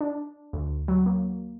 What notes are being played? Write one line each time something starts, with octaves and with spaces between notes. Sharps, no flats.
D4
D2
F#3
A#3